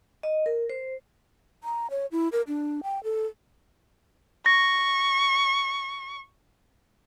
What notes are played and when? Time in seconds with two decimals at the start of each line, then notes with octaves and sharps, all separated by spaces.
0.23 D#5
0.46 A#4
0.70 C5
1.64 A#5
1.91 C#5
2.12 E4
2.32 A#4
2.47 D4
2.83 G5
3.04 A4
4.46 C#6 A#6